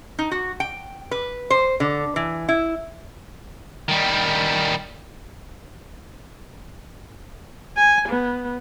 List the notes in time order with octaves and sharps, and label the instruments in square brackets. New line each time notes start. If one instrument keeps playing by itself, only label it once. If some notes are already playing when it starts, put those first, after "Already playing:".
[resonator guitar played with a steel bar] D#4
F#4
G5
B4
C5
D3
E3
E4
[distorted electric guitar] D#3 G3
[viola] G#5
B3